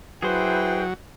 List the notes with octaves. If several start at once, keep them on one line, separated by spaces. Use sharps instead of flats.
F#3 E4 G#4 B4 C5 G5